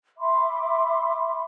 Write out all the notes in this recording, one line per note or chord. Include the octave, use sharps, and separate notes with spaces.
E5 B5 C6 D6